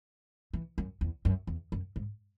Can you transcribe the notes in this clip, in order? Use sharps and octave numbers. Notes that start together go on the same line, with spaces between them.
E3
F#2
E2
F#2
E2
F#2
G#2